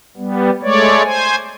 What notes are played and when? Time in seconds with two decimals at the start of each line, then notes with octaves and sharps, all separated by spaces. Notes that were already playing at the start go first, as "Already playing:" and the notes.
0.17 G3 B3
0.62 G#3 A3 C#5 D5
1.04 C5 G#5